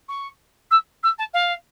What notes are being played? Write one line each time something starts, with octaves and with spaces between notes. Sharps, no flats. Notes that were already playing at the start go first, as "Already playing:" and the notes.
C#6
E6
E6
A5
F5